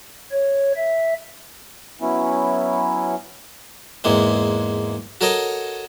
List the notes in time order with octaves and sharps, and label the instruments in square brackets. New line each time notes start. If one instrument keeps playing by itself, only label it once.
[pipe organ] C#5
E5
[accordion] F#3 B3 C#4 E4
[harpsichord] E2 G#2 G#3 A#3 C4
F#4 A4 A#4 C#5 D#5 A5